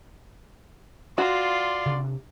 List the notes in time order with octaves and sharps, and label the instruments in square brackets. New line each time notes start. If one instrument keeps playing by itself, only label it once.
[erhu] F4 [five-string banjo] F#4 [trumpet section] D5 C6
[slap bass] C3 D4